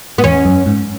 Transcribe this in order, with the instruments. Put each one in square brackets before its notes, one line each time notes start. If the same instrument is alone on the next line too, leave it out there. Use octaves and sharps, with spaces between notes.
[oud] B3
[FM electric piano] E2 [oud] C#4
[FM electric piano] F#2
G#2